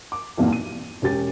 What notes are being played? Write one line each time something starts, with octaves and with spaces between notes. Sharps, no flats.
D6
B1 E2 G2 A#2 A#3
D#7
E1 C#4 G4 A6